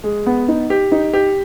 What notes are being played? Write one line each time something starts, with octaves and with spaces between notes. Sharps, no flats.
G#3
B3
D#4
G4
D#4
G4